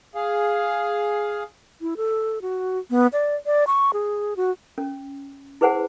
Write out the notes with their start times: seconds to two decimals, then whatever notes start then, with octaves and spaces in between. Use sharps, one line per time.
0.15 G#4 F5
1.81 E4
1.97 A4
2.42 F#4
2.90 B3
3.13 D5
3.46 D5
3.67 C#6
3.93 G#4
4.37 F#4
4.78 C#4
5.61 E4 G#4 B4 C5 F#5 G#5